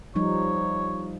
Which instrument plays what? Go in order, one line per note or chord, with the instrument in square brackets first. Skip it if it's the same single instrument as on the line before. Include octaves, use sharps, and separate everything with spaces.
[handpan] F3 G3 D#4 [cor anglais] C#5